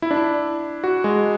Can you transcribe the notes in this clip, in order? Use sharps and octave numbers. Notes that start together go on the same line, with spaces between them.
E4
D4
E4
F#4
G#3